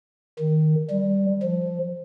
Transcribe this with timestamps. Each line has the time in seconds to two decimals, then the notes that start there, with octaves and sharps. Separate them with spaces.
0.39 D#3
0.90 G3
1.42 F3